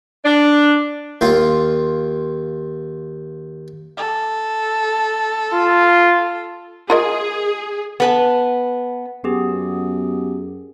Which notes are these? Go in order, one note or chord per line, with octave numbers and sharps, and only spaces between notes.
D4
D#2 F4
A4
F4
F4 G#4 A#4 D#5
B3 B4 A5
F#2 B3 G4 G#4